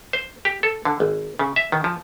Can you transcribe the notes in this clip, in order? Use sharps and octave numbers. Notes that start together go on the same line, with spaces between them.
C5
G4
A4
D3
G#1
C#3
E5
D#3
F3